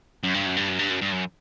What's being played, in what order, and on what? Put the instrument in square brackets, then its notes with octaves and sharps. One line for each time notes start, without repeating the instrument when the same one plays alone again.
[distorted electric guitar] F#2
G2
F#2
G2
F#2
G2
F#2
G2
F#2